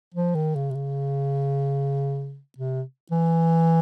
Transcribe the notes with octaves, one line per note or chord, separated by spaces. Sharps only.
F3
D#3
C#3
C3
C#3
C3
E3